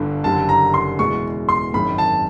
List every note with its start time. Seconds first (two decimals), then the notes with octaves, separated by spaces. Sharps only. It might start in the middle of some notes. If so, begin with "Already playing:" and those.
Already playing: G1 G2 D3
0.24 F#1 F#2 D3 G3 A5
0.49 A#5
0.74 C6
0.99 E2 B2 G#3 C#6
1.49 C6
1.74 G#1 F#2 D#3 G#3 B5
1.98 A5